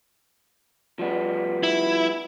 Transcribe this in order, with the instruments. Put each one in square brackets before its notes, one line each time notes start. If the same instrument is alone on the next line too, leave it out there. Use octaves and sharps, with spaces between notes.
[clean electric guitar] F3 G3 B3
[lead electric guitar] E4